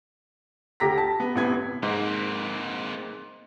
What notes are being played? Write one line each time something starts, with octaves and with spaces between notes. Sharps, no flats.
D2 G4 A#5 A#6 B6
A5
B3
A1 C3 B3 G#6
G#2 A#3 C4